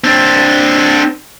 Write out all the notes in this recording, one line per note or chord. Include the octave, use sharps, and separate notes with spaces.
C4 D4